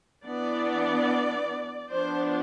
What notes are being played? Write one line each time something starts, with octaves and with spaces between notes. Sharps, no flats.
E3 B3 D4 D5
F3 B3 D4 C5